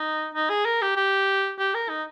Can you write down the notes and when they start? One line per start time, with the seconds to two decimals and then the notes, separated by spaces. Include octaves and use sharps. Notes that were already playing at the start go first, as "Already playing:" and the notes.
Already playing: D#4
0.35 D#4
0.50 G#4
0.65 A#4
0.82 G4
0.96 G4
1.59 G4
1.75 A#4
1.89 D#4